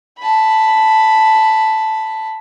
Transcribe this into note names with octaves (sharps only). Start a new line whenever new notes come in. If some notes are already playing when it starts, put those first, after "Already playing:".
A5 B5